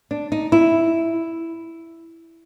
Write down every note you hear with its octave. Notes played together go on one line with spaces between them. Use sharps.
D4
D#4
E4